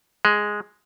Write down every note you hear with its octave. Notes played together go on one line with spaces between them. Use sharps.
G#3